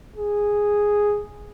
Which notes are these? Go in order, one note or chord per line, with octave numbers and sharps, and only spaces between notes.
G#4